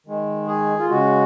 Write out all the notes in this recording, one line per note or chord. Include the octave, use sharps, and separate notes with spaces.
D#3 G#3
G#4
F4
C#3 G#3 F#4